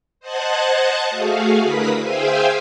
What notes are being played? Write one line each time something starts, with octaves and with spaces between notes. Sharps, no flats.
C5 D#5 F#5 A5 F#6 G#6
A3 F#4 G#4 F5
D3 E4 A#4 B4 D#6 B6
G#4 C5 E5 F5 G5 G#5